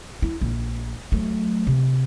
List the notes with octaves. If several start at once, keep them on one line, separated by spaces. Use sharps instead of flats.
E4
A#1
F#3 A3
C3